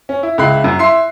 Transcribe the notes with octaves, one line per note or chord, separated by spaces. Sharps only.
C#4
E4
C#2 E4 B5 F#6 C7
F#2
E4 E5 C6 C7